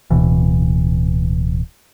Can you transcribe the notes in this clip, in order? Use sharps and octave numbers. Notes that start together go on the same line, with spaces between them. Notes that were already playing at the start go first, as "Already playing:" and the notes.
D1 B2 E3